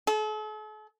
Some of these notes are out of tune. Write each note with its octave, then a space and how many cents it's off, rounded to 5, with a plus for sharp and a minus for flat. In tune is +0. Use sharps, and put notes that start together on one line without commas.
A4 -45